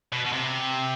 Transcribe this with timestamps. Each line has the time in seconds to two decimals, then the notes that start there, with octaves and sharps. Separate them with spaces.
0.12 B2
0.25 B2
0.32 C3